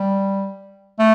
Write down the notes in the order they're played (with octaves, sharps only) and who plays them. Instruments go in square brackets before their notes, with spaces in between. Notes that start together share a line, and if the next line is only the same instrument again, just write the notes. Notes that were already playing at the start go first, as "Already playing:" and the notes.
Already playing: [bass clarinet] G3
A3